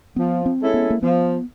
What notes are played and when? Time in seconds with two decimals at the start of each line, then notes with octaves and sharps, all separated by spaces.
0.16 F3 B3
0.46 C4
0.59 G#3 C#4 E4 A4
0.74 B3
0.90 A#3
1.02 F3 B3